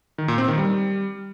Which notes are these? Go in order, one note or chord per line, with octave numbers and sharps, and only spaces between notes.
D#3
A#2
C4
D#3
G3